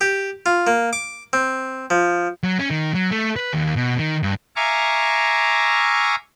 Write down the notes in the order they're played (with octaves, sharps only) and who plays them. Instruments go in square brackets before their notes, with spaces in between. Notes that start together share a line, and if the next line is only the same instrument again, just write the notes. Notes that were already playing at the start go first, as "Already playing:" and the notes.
[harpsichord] G4
F4
A#3
D6
C4
F3
[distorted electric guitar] F#3
C#4
D#3
F#3
A3
B4
D#2
B2
D#3
G2
[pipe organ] E5 F5 G#5 A#5 C#6 D6